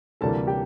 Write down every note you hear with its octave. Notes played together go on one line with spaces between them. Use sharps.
D2 C3 E3 G3 A#3 A4 A5
G4 G5